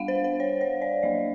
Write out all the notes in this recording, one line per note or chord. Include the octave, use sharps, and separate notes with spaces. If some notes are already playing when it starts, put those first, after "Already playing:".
Already playing: G3 B3 D4 F5 F#5
C5
C5
C#5
C#5
D5
F#3 A#3 D4 D#5